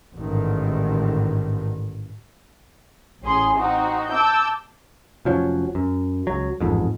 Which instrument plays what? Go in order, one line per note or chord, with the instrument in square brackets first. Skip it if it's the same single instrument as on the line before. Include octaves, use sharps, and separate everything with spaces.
[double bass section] A1 G#2 D3 D#3
[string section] A1 C#4 G#4 C6
C4 D#4 F#4
A5 D6 E6 G6
[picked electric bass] F1 F3 F#3 C#4
F#2
C#2 F#3
A1 F2 G#2